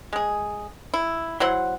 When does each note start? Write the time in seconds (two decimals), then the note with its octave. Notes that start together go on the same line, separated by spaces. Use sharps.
0.13 G#3 G#4
0.94 E4
1.40 F#3 E4 C5 F#5